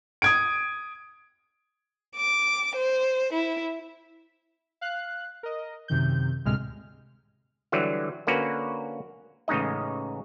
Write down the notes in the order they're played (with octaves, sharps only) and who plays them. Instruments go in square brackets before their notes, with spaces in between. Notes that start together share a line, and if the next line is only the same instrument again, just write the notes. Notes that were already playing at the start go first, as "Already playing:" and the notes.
[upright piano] D#6 G#6 D7
[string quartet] D6
C5
E4
[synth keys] F5 F#6
A#4 D#5
F#2 C3 D#3 G6
D2 A2 C3 G#3 F6
[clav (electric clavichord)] D3 E3 F#3 G3
D3 A#3 C#4 F#4 B4
A1 C#3 G#3 D#4 D#5